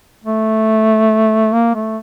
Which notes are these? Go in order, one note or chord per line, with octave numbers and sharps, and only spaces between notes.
A3
A#3
A3